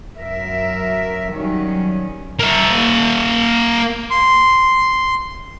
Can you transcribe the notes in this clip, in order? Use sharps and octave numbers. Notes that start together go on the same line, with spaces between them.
F#2 F#3 A#4 E5
D#3 F#3 G3 C#4
A#3 E5
C6